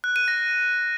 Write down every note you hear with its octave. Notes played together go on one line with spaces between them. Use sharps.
F#6
D#7
A#6